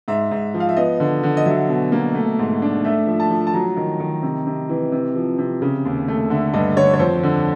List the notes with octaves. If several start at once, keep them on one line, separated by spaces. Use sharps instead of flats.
G#2 E5
G#2
F3
F5
E5
B3 D#5
D3
D3
D#5
F#3 E5
B2
A#3
A3
G#2
D4
A3 E5
F3
A5
F3
A5
F#3 A#5
D#3
D#3
C3
C3
E3
C3
F3
C3
C#3
D#2
A3
D3 E5
G2 D#5
D3 C#5
C#5
F2 C5
D3